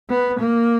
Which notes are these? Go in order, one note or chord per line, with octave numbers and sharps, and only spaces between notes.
B3
A#3